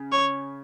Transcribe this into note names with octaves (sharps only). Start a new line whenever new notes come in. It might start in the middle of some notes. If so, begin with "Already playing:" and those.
Already playing: C#3
C#5